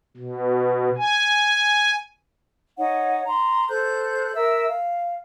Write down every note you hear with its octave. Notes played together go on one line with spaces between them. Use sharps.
B2
G#5
D#4 C#5 F#5
A#5 C6
A4 C5 F#6 G6
A#4 E5 E6
F5